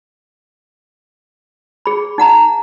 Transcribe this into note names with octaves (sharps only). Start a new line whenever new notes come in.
G#4 B5
D#4 F#5 A#5